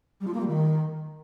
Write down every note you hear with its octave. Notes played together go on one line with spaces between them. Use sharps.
G3
F4
A#3
G3
D#3